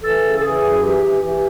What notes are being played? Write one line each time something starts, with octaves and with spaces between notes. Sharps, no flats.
E3 A4
C#3
A4
E3 G#4
F#2
E3 G4
E3
E3 G4